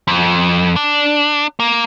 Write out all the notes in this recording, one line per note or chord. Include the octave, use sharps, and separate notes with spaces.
F2
D4
A#3